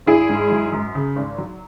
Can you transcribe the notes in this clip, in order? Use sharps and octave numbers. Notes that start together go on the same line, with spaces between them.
G#1 E4 G#4
G#2
F#3
F#2
C#3
G#1
F#3